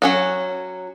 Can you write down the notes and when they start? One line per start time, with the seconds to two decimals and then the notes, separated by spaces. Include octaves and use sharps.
0.02 F#3 C#4 F#4